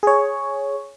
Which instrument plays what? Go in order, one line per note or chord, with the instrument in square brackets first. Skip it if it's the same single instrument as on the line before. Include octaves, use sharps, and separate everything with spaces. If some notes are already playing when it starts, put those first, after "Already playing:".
[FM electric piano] G#4 C#5